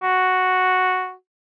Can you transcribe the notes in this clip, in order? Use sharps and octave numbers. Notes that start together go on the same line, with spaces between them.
F#4